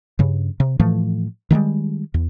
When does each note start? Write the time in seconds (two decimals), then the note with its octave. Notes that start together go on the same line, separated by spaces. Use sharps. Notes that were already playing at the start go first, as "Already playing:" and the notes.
0.19 G2 C#3
0.60 C3
0.80 A2 E3 F3 A3
1.51 D#3 F3 G3 G#3
2.14 E2